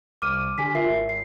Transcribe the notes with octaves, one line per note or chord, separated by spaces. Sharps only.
C2 D6 F6 D#7
D3 G4 G#5 B6
F4 A#4 E5 C7
G#1
C7